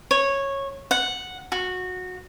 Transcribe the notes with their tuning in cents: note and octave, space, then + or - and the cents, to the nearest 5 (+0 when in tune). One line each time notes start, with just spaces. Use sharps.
C#5 -10
F#5 -5
F#4 -15